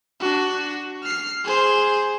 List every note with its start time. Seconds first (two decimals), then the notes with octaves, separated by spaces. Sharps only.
0.20 D4 F#4
1.03 F6 C7
1.44 G#4 C5